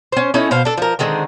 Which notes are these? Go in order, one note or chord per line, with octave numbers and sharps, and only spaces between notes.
C#4 C5
C#4 D#4 E4 A4
B2 C5 F5
D4 A4
F3 A#4
D3 D#3 G#3 C4